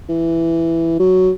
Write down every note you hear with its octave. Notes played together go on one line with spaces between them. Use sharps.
E3
F#3